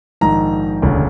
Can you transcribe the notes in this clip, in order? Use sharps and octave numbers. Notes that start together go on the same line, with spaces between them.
A#1 G#2 D#3 A#5
E1 D2 C#3